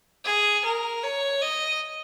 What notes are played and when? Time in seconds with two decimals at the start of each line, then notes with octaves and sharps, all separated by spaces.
0.24 G#4
0.65 A#4
1.04 C#5
1.42 D#5